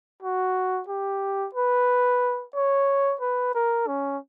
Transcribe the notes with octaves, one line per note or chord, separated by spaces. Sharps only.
F#4
G4
B4
C#5
B4
A#4
C#4